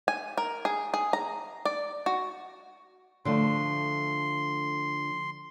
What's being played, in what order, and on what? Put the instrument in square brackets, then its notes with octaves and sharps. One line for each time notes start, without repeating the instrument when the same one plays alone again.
[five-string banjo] G#5
A#4
G#4
G#4
A#5
D5
F#4
[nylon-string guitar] D3 F3 A3 [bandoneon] C6